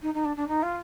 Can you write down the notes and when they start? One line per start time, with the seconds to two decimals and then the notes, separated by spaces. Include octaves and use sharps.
0.02 D#4
0.14 D#4
0.25 D4
0.36 D4
0.47 D#4
0.62 F4